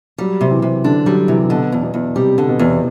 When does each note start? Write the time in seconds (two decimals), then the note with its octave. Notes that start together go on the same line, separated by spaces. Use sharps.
0.18 F#3 G3
0.41 C3
0.51 E3
0.62 C3
0.84 D3 D4
1.06 F#3 G3
1.28 C3 E3
1.50 B2 D3
1.72 E2
1.83 B2
1.94 E2
2.16 C3 G3
2.38 D3
2.49 B2
2.59 E2